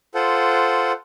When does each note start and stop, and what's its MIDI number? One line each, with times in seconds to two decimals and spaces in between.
0.15 0.92 65
0.15 0.92 69
0.15 0.92 72
0.15 0.92 78